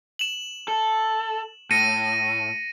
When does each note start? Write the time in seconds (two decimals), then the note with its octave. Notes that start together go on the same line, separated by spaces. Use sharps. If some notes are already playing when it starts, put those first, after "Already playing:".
0.19 E7 F#7
0.68 A4
1.71 A2 A#6 C#7 D#7